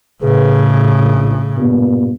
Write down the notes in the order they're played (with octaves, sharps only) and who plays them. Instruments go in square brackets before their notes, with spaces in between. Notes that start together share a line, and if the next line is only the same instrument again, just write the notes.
[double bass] A2 C#3 [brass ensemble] G#4 B4
[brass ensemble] A#1
G2 A#2 B3